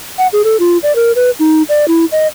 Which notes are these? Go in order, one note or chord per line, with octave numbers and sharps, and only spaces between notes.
F#5
G#4
A4
F4
D5
A#4
B4
D#4
D5
E4
D#5